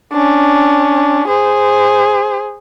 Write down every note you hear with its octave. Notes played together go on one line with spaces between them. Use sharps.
C#4 D4
G#4 C5